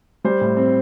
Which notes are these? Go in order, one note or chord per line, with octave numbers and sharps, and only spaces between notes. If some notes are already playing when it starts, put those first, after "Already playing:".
G3 C5
A2
C4